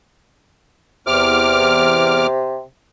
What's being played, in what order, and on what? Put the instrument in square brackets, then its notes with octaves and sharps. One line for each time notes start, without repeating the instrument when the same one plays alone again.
[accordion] E2 D6 F6 [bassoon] C3